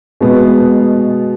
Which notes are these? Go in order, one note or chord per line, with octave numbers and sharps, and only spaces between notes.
B2 G#3 B3